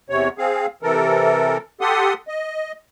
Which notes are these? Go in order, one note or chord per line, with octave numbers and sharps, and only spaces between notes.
E2 C3 C#5
C4 G#4 F5
C3 E3 A4 A#4
G4 A4 F#5 C6 D#6
D#5